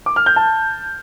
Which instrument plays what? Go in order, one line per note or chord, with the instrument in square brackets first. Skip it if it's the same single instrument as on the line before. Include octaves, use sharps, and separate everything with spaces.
[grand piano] D6
F6
G6
A5